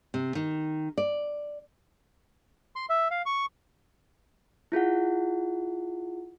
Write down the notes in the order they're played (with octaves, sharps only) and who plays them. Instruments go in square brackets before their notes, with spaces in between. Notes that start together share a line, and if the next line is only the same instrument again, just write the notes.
[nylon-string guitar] C3
D#3
D5
[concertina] C6
E5
F5
C#6
[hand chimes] E4 F4 G#4 F#5